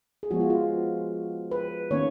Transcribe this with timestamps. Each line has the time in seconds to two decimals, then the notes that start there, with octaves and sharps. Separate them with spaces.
0.23 G#4
0.31 F3 G#3 B3 F#4
0.40 F4
0.50 F4
1.51 B4
1.91 D#3 A#3 C#4 C#5